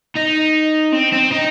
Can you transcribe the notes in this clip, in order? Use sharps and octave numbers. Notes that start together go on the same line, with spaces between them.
D#4
C4
C4
D#4